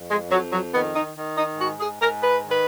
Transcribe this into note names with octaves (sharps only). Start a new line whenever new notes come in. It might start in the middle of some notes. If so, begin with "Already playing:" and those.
Already playing: F2
G#3
F2 F#3
F#3
D#3 B3
D#4
D#3
D#4
G#2 F#4
G#4
G#2 A#4
B4
D#3
B4